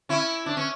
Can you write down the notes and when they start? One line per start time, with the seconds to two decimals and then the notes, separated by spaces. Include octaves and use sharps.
0.09 C#4 E4
0.46 D4
0.57 C#4